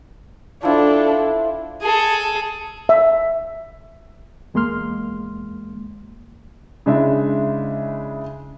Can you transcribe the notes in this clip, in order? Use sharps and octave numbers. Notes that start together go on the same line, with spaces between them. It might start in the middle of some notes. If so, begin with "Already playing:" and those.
F3 D4 E4 A4 G5
G#4 A4
E5
E2 G#3 A#3 C6 F6
C#3 G#3 D4 E4 E5